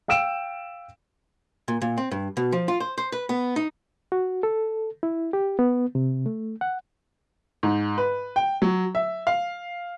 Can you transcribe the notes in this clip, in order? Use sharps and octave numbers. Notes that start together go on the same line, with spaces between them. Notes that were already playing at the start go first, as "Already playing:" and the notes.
F5 G5 E6 D7 E7
A#2
A#2
C4
G2
B2
F3
F4
C5
C5
B4
B3
D#4
F#4
A4
E4
G4
B3
C3
A3
F#5
G#2
B4
G5
F#3
E5
F5